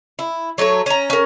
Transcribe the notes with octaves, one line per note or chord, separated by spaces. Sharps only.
E4
F#3 A3 B4 C#5
C#4 A#5
C#4 A#4